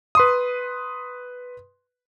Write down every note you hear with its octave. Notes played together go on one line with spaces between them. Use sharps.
B4 C6 D#6